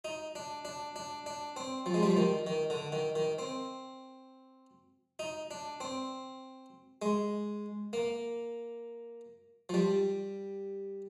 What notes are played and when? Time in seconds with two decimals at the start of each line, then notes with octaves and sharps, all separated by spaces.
0.05 D#4
0.35 D4
0.65 D4
0.96 D4
1.26 D4
1.56 C4
1.86 F3
1.94 G#3
2.03 G3
2.10 F3
2.17 D#3
2.47 D#3
2.70 D3
2.92 D#3
3.16 D#3
3.39 C4
5.19 D#4
5.51 D4
5.81 C4
7.02 G#3
7.93 A#3
9.69 F3
9.74 G3